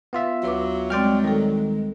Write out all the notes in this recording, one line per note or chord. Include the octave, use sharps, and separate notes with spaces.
B3 F4 E5
D2 F#3 B4 D6
G3 G#3 C4 D5 G5 F6
D#3 G3 A4